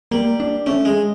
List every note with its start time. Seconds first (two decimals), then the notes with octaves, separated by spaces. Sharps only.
0.11 G3 A#3
0.40 D4
0.66 A3 C#4
0.85 G#3